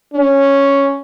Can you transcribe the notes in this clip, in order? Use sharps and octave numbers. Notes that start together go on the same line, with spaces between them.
C#4